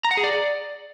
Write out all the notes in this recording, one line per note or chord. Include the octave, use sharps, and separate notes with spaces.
A#5
F#5
G#4
D5